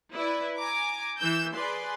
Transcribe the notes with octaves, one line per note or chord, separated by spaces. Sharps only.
E4 B4 D5
G#5 A#5 D6
E3 E6 G6
G#4 B4 D5 C6